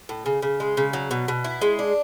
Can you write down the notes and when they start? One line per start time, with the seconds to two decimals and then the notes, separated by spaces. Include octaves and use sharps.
0.09 A2
0.26 C#3
0.42 C#3
0.60 G#3
0.77 C#3
0.93 F#3
1.11 B2
1.28 B2
1.44 E4
1.62 G#3
1.79 D4